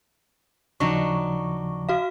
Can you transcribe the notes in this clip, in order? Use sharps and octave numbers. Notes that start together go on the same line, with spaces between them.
D#2 C#3 F3 F#3 D4 D#4 C#6
F#4 F5